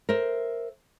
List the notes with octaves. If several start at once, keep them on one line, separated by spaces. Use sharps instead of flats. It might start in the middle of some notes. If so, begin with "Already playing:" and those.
A#4 C5 E5